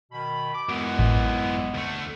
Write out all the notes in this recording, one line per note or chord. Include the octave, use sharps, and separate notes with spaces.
B2 D#3 B5
D6
F#2 E3 G#3 B3
A1
D2 A3